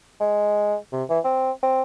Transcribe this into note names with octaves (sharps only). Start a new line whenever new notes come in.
G#3
C3
E3
C4
C4